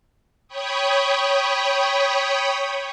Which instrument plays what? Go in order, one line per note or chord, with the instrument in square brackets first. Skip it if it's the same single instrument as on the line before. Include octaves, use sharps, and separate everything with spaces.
[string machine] C#5 G5 B5 C#6 D#6